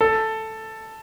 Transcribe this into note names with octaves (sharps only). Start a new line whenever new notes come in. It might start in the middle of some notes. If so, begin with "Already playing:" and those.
A4